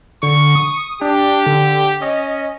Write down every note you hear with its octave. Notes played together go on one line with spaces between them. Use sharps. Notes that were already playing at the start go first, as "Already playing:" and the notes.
D3 C#6
D#6
D4 G4
D3
C#4 D#5